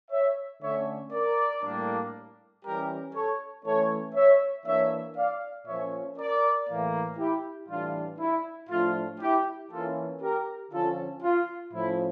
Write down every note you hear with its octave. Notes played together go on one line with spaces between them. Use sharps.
C#5 E5
D3 A3 C#4 C#5 E5
A#4 D5
A2 G3 A#3 D4
E3 G3 C#4 G4 A#4
A4 C#5
E3 A3 C#4 A4 C#5
C#5 E5
E3 A#3 D4 C#5 E5
D5 F5
A#2 F3 C#4 C#5 E5
A#4 D5
A2 E3 A#3
E4 G4
A2 E3 G3 D4 F4
E4
A2 F3 A3 D4 F4
E4 G4
E3 A#3 C#4 F4 A4
G4 A#4
D3 F3 C#4 F4 A4
F4
A2 F3 C#4 E4